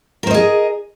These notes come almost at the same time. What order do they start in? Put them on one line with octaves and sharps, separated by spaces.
A#4 C5 D#5 G#4